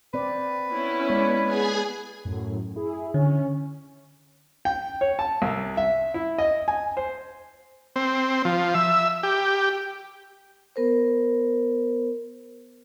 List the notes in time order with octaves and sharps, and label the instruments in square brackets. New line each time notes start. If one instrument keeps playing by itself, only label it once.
[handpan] C4 D5 [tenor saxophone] B4
[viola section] B3 C#4 E4
[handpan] G#3 C#5 D5
[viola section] B3 [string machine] G#4 G#5
[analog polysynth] F#2 A2
E4 G#4
[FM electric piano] D3 [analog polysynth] C#4
[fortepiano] G5
C#5
A5
C2
E5
E4
D#5
G#5
C5
[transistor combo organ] C4
F3
E5
G4
[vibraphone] B3 A#4 C5